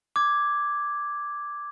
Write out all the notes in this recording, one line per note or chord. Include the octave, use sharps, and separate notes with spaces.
D6 G#6